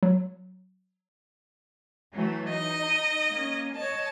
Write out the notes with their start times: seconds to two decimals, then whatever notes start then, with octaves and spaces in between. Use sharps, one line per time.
0.03 F#3
2.11 E3 F#3 A3
2.50 D#4 D#5
3.29 A#3 C#4
3.76 C#5 D#5 A5